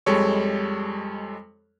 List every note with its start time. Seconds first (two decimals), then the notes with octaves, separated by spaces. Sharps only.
0.06 F2 G3 G#3 A4 C#5 C#6